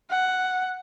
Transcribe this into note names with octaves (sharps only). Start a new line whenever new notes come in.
F#5